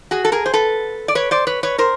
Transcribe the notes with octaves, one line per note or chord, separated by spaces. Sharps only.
F#4 G#4
A4
G#4 A#4
C5
A4 B4
D5
B4 C#5
C5 D5
B4 C#5
B4 C#5
A#4 C5